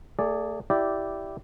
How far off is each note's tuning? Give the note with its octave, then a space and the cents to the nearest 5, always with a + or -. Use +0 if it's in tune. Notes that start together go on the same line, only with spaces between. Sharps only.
A3 +35 G#4 -5 D5 -5
E4 +0 G4 -10 D5 +0